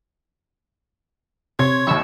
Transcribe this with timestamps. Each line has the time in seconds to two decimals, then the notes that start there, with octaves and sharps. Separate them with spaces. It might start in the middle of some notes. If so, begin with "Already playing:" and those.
1.59 C3 C#5 C6 G#6
1.87 A1 D#2 E4 C#6 E6